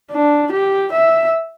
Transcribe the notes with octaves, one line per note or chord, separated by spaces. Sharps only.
D4
G4
E5